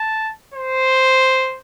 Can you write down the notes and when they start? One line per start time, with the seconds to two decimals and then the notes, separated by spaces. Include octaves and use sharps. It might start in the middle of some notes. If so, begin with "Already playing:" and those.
Already playing: A5
0.54 C5